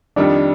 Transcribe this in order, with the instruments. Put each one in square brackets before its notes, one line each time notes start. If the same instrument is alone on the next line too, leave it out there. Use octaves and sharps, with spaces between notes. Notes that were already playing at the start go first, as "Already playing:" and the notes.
[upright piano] F2 D#3 G3 [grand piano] D4